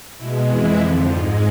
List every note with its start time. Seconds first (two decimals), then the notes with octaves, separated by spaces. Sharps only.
0.17 B2 G#3 E4
0.48 F2 E3 G#3 E4
0.77 F2 D3 F3
1.08 G#2 G#3 F4